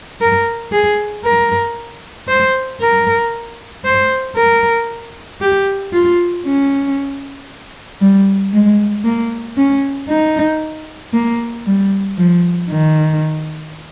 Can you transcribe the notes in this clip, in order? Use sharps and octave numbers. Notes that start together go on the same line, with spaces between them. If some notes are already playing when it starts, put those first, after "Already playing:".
A#4
G#4
A#4
C5
A#4
C5
A#4
G4
F4
C#4
G3
G#3
A#3
C#4
D#4
A#3
G3
F3
D#3